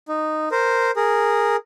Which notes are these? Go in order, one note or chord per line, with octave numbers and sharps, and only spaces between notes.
D#4
A#4 C5
G#4 A#4